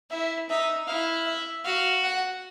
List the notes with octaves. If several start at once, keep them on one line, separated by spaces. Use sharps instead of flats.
E4 E5
D#4 E5
E4 F5
E5
F#4 F5
F#5